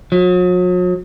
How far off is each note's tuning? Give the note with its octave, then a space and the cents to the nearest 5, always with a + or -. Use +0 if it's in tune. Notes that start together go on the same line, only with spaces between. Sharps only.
F#3 -40